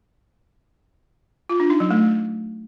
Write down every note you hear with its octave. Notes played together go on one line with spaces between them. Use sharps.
F4
D4
D#4
F#3
A3